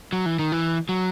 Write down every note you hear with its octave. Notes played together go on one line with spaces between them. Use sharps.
F#3
E3
D#3
E3
F#3